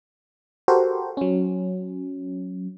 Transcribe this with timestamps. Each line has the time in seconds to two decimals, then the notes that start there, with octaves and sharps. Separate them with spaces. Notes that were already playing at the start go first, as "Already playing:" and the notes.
0.68 F#4 G4 A4 A#4 C5
1.17 F#3 C#4